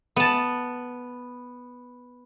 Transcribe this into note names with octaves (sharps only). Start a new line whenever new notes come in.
B3 A5